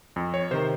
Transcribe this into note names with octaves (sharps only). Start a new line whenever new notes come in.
F2
C#5
C3 D#3 C5